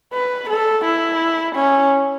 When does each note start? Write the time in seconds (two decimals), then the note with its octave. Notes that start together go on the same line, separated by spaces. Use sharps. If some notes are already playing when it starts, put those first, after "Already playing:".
0.14 B4
0.50 A4
0.85 E4
1.56 C#4